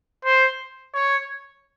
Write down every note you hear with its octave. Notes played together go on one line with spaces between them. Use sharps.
C5
C#5